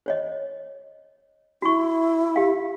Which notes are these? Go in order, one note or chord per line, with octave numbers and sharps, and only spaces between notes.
C5 C#5 D#5
E4 F#4 C#6
G4 F5